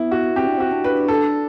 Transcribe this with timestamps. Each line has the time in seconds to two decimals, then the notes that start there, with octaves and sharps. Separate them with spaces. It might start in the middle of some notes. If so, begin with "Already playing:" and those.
Already playing: B3 E4
0.11 F#4
0.36 C4 G4
0.47 D4
0.58 C4 F#4
0.72 D4
0.84 B4
1.08 A4